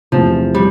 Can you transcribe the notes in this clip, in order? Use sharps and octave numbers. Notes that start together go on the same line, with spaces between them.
F1 E2 C3 F3
G3